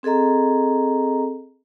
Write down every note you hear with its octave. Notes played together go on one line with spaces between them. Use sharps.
C4 G#4 A4 D#5 A#5